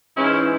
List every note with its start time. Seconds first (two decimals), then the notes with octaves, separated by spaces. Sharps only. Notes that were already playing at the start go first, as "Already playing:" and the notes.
0.16 G#2 E3 G#3 C#4 E4